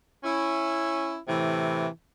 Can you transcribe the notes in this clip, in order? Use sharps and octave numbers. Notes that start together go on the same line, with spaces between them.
C#4 E4
A2 C3 E3